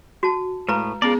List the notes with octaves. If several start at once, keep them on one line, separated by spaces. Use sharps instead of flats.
F#4 A5
A2 G#3 B4 A#5
B3 C#4 F4 G#4 A#4 D5